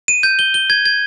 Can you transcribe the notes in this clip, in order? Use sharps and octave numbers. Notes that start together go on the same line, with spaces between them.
D#7
G6
G7
G7
G#6
G#6